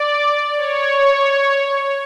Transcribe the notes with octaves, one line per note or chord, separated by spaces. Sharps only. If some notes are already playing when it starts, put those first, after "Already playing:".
Already playing: D5
C#5